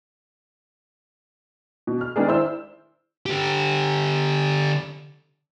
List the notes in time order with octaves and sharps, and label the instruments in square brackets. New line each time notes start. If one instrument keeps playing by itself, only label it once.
[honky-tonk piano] B2
F6
D#3 G#3 B3 D4 G#4
E4 C5 D5 E6
[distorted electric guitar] D3 G4